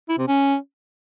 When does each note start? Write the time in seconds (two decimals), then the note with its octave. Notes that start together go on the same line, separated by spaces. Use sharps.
0.09 E4
0.18 C3
0.28 C#4